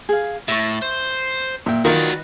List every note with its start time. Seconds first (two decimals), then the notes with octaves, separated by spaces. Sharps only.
0.09 G#4 F5
0.48 A2 E5 C#6
0.82 C5
1.66 A#2 E5 G5
1.85 D#3 F4 F#4 A#4 B4 D5 D#5